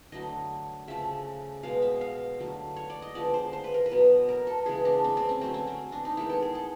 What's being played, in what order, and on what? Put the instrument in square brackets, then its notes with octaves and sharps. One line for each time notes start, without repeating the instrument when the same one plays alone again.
[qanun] D3 F#3 A3 D#5
C#3 F3 A3 E5
B2 G#3 B3 F5
E5
F5
D3 F#3 A3
C#5
D5
D#5
D3 F3 G#3 B3 D5
C5
C5
B4
A#4
B4
B2 F#3 B3
A#4
A4
C#3 E3 G#3 B3 G#4
D4
C4
C4
C#4
D3 F#3 A3 C4
C#4
C4
D4
D#4
D#3 G#3 B3 E4
A4
G#4
A4